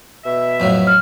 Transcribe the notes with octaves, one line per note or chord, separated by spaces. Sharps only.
B2 E5
F2 A2 F#3
F6